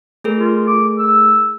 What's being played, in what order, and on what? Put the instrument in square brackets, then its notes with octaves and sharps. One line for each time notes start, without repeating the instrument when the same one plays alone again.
[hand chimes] A3 G#4 A#4
[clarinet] F4
D6
E6